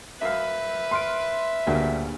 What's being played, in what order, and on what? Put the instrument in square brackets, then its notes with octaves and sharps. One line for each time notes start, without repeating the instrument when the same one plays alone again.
[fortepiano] F#2 F5 [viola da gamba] B4 [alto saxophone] E5
[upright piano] C6 F6 D7
[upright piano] D2 [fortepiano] G2 A#2 C#3